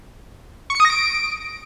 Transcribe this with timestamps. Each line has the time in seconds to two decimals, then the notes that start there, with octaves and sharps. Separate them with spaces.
0.70 C#6
0.75 C#7
0.80 D#6
0.85 A#6
0.90 D7